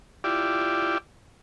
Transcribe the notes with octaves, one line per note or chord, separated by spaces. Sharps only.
E4 F4 G4 D5